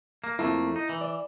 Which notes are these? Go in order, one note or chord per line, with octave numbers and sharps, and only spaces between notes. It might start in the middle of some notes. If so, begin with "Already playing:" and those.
A#3
F2 A3 A#3 E4
D#4
E3
D5